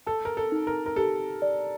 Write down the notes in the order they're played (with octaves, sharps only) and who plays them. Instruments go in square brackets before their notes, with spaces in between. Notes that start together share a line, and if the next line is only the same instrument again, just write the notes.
[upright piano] A4 [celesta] A5
[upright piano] A#4
A4
[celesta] D#4
[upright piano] A#4
A#4
[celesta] G4 [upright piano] A4
[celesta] D5